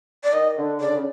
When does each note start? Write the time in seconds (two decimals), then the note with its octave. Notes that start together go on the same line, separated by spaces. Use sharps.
0.24 D5
0.33 D#3 D#5
0.57 D3
0.80 C#3 D5
0.88 D3
0.95 C#3